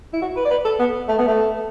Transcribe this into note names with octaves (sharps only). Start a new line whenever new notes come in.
E4
F#4
B4
D5
B4
A4
B3
A3
B3
A3